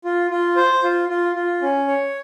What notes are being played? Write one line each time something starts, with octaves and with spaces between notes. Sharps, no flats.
F4
F4
C5
F4
F4
F4
C#4
C#5